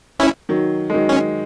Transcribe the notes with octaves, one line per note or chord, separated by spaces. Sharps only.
C#4 E4
D#3 F#3
G#3
D#3 F#3
C#4